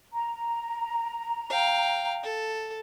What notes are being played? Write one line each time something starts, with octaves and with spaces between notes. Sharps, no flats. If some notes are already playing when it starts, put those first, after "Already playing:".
A#5
F5 G5
A4